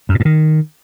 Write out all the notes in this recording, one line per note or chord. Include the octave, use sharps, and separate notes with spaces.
F#2
A#2
G2
D#3